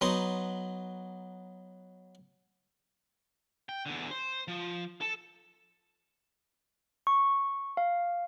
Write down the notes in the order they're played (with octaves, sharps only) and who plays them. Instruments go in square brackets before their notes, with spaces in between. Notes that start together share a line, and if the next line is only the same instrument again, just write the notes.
[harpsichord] F#3 B3 D#4 C6
[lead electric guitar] G5
E2 D3
C5
F3
A4 A5
[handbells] C#6
F5